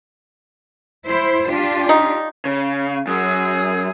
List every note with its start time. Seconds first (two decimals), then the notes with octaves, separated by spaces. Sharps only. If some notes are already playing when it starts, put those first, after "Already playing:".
1.07 E4 C5
1.49 D4 F4 G4
1.89 D#4
2.45 C#3
3.07 F#2 G#4 D#6 E6